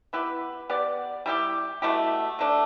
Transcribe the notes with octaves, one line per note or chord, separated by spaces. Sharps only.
B3 E4 G4 B4
B3 G4 D5
G3 E4 G4
B2 A3 E4 G4
D3 A3 D4